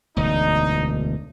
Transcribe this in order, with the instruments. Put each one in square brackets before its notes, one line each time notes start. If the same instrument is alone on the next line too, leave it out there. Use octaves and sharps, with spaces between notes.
[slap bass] E1 D2 [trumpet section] D#4